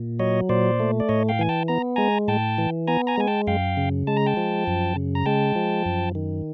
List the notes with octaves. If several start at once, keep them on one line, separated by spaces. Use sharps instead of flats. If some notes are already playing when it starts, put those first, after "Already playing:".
Already playing: A#2
F#3 C#5 D#5
A#2 C5 D5
A3
D5
A2 C#5 D#5
F5 G5
E3 G#5
G5 A5
B3 A#5
G#3 G#5 A#5
A2 G5 A5
E3
B3 G#5 A#5
G#5 A#5
G#3 G#5
G5 A5
F#2 F5 G5
C#3
G#3 A5
A#5
G5 A5
F3
F#2
C#3
A#5
G#3 G5 A5
F3
F#2
D#3